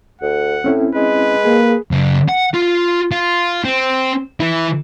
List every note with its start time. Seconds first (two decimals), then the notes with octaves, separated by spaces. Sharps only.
0.21 D2 F#5
0.64 A2 C4 C#4 E4
0.95 G#3 B4
1.45 A#3 G#4
1.91 F#2 C#3
2.28 F#5
2.54 F4
3.11 F4
3.64 C4
4.40 E3 E4